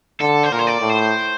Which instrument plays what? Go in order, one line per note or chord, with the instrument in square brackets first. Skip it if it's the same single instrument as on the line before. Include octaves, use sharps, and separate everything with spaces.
[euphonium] D3 [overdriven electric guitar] A4
[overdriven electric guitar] C5
[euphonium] A#2 [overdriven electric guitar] A#4
[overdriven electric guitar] C5
D5
[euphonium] A2
[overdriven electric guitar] C5